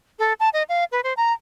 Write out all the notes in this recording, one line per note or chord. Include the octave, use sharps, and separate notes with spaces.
A4
A5
D#5
F5
B4
C5
A#5